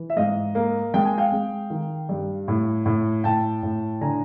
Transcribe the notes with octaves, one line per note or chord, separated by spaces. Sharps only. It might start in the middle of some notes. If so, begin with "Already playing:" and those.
Already playing: E3
E5
G#2 D#5 F5
A#3
G#3 G5
G#5
F5 G5
G#3
D#3
G2
A2
A2
A2 G5 A5
A2
D3 G#5 A#5